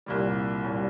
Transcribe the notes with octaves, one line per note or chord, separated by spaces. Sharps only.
C2 A#2 G3
C2 A#2 G3